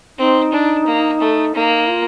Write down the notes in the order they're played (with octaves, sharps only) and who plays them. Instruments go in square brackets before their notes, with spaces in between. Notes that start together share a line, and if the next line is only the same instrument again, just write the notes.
[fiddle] C4 [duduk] D#4
[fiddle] D4
A#3
A3
[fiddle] A#3 [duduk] D#4
[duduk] F4